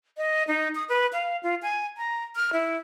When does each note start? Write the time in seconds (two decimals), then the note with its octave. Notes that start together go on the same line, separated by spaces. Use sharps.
0.18 D#5
0.48 D#4
0.75 D#6
0.89 B4
1.13 F5
1.43 F4
1.63 G#5
1.98 A#5
2.36 F6
2.53 E4